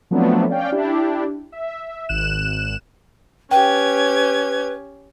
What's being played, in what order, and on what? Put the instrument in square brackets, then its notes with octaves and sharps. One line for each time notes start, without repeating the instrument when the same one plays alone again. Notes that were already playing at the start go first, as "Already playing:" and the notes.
[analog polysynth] F3 F#3 A3 B3 C4 D4
C#4 D5 F5 G5
D4 E4 G4
E5
G#1 F#6 E7
[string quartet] C#4 G4 G#6 [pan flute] B4 [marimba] G5